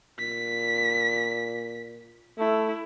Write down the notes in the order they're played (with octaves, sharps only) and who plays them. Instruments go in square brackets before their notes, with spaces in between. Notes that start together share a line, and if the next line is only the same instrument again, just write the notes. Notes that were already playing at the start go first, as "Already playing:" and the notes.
[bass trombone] A#2 [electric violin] B6
[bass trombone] A3 [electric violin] E4